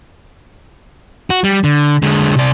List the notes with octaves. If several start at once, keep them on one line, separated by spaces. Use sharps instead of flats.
F#4
G3
D3
D3 G#3
C3 D5